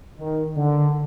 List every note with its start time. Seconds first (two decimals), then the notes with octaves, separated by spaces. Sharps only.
0.18 D#3
0.57 D3